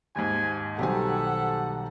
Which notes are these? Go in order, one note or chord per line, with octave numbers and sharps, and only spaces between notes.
D#2 G#2 G#5
B1 D#3 G3 G4 A4 C5 F#5 G#5